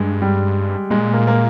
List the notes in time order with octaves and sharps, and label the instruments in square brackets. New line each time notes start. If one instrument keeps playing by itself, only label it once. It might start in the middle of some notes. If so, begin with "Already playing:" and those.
Already playing: [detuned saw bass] G2 [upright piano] G#3
[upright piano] G3
[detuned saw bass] A#2 [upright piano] G#3
[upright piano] A#3
A#3